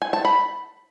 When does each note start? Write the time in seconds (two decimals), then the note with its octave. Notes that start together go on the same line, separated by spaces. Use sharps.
0.02 G#5
0.13 A5
0.25 B5